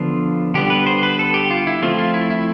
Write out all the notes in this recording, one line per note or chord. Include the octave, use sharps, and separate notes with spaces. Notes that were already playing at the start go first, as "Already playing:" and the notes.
Already playing: D3 F3 B3 F4
D3 G3 B3 G4
B4
C5
B4
A4
G4
F4
E4
F3 A3 C4 F4
F4
E4
E4